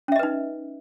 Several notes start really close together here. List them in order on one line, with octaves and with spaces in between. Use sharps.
C#4 E5 D#5 B4 D#4